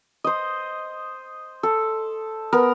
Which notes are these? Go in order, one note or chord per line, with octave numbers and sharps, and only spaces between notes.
C5 D#5
A4
B3 A#4